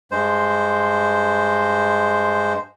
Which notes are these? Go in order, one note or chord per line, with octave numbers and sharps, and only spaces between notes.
G2 G#3 C5